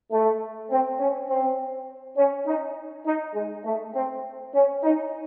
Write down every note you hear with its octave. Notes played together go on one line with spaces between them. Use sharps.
A3
C4
C#4
C4
C#4
D#4
D#4
G#3
A3
C4
C#4
D#4